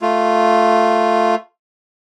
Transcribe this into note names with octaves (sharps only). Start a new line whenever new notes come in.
A3 F4